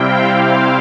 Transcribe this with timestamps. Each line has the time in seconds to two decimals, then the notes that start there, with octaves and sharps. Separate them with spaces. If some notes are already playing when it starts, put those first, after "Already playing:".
Already playing: C3 G3 C4 E4 F5 G5
0.34 C5